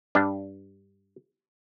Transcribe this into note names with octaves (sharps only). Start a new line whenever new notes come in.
G2 D4